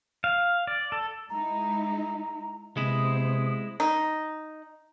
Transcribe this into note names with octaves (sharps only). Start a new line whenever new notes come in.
F5
D5
A4
G#3 D#4 E4 A#5
C3 G#3 B3 E4 C5 D#6
D#4